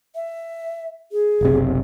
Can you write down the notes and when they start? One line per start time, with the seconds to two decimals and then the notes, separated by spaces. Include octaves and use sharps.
0.15 E5
1.12 G#4
1.41 F#1 B1 C3